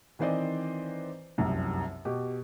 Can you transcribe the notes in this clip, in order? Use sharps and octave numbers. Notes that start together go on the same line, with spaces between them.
D#3 E3 C4 C5 D5 D#5
F1 C2 F#2
B2 G4